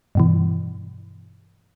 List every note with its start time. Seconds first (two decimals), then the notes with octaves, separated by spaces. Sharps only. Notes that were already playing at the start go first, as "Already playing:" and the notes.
0.15 G2 B2 E3